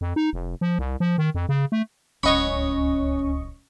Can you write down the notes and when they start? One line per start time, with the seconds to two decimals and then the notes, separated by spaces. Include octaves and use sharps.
0.01 F2
0.16 D#4
0.33 F1
0.61 F3
0.79 C2
1.00 F3
1.18 D#3
1.35 F2
1.49 C#3
1.72 A3
2.23 D1 C#2 C#4 C#5 D#5 F#5 B5 C#6